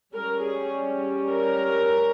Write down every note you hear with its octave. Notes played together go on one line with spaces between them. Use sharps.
G3 C#4 A#4
G#4
A#4